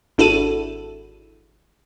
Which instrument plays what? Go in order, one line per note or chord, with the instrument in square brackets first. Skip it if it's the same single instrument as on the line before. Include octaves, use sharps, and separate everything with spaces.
[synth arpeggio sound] G#1 D4 E4 F#4 A4 D#7